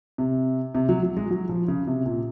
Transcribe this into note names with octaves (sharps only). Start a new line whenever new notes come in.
C3
C3
F#3
F#3
G#3
F#3
F3
C#3
C3
A#2